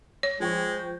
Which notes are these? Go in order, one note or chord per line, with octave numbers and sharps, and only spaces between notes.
C#5
F3 G#3 C5 G5 C#6